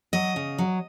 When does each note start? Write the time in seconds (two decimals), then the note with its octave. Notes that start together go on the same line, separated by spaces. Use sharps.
0.13 F#3 D#5
0.36 C#3
0.58 F#3